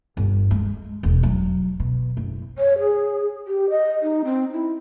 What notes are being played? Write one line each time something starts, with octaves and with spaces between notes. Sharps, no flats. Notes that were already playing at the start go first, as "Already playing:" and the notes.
G1
G#3
E1
F#3
B2
F#1
C#5
G#4
G4
D#5
D#4
C4
E4